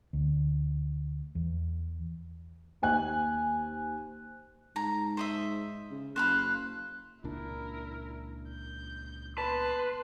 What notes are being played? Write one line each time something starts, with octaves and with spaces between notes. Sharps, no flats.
D2
E2
D#2 C5 G#5 F#6
G#2 A#5
C5 D#5 E5
C#3
F#1 C5 F5 B5 F#6
C#2 A#2 D4 E4 A#4
G6
B3 B4 A5 C6